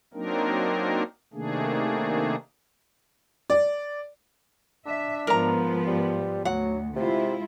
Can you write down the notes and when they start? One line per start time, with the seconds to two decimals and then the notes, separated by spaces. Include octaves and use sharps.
0.14 F#3 A#3 C4 D4 D#4 A#4
1.33 C3 D#3 A3 A#3 D4 G#4
3.50 D5
4.86 D4 E5
5.27 G#2 F3 B3 A#4 A#5
5.87 G3
6.45 D2 F#3 F#5
6.96 C3 G#3 E4 F4